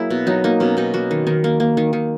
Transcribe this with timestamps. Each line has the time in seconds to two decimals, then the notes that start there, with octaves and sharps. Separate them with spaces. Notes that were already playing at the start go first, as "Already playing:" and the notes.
Already playing: F#3 A#3 E4 G#4
0.10 B2
0.27 F#3 D#4
0.44 A#3 D#4
0.60 B2 C#4
0.77 B2 D#4
0.94 A#3 F#4
1.11 D#3
1.27 D#3 A#4
1.44 A#3
1.60 A#3
1.77 D#3
1.93 D#3